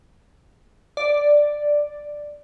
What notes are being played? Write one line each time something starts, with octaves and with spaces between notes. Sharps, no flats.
D5